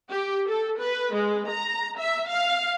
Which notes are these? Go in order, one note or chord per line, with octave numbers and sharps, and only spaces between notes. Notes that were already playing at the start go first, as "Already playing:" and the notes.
G4
A4
B4
G#3
A#5
E5
F5